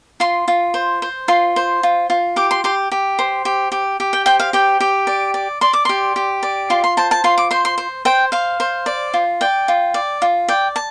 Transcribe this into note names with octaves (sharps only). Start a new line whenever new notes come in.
F4 C6
F4
C5
C5
F4 C6
C5
F4
F4
G4 D6
C6
G4 C6
G4
C5
G4
G4
G4
G5
C5 G5
F5
G4 G5
G4
D5
D5
D5 C6
D6
G4 C6
G4
D5
F4 C6
C6
C5 A5
A5
F4 C6
D6
C5 C6
C6
C5
C5 G5
C5 F5
C5
D5
F4
D5 G5
F4
D5
F4
D5 G5
A5